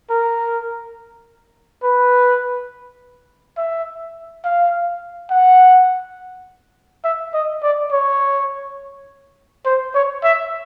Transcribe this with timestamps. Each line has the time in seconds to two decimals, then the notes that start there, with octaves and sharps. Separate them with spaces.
0.10 A#4
1.83 B4
3.57 E5
4.44 F5
5.31 F#5
7.04 E5
7.34 D#5
7.63 D5
7.92 C#5
9.65 C5
9.95 C#5
10.24 E5